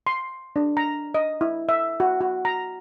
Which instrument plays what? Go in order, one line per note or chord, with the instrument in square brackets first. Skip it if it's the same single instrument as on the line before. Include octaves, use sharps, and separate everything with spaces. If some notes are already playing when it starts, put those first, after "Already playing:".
[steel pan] C6
D4
A#5
D#5
E4
E5
F#4
F#4
A#5